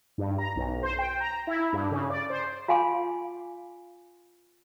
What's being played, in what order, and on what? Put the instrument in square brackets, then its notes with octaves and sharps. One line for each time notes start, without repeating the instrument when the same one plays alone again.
[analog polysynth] G2
A#5
B1
C5
G5
A#5
E4
G2
C#3
D5
C5
[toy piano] F4 F5 G#5 C6 D6